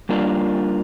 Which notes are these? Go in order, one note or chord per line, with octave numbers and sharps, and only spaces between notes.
G3 A#3 D4 F4 A#4